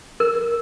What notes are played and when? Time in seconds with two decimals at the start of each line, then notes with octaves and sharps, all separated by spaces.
0.20 A#4